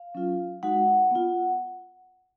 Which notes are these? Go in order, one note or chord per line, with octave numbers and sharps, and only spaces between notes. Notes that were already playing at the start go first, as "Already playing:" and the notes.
Already playing: F5
F#3 C#4 F4
G#3 D#4 F#4 F#5
B3 F4